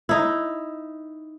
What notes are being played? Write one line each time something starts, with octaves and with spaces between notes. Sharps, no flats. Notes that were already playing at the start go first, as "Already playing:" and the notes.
D#4 E4